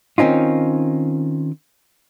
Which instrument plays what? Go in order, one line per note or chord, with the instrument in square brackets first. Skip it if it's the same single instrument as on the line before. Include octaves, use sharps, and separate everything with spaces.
[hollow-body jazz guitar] D#3 C4 C#4 D#4 F4